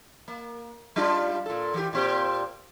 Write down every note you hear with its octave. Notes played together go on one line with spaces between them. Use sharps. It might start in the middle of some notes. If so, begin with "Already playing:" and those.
A#3
G3 D4 F4
A#2 A4
E3 G4
A#2 C4 G4